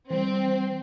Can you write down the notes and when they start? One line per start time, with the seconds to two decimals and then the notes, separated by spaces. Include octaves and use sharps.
0.10 E3 G3 C4